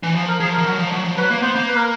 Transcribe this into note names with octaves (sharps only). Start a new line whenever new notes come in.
E3
F3
A#4
F3 G#4
A#4
F3
F#3
F3
F#3
F3
F#3 B4
A#3
B3 C5
A#3
B4
A#4